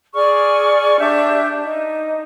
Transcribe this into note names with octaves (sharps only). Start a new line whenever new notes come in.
G#4 D5 C#6 F6
D4 G4 E5 G6
D#4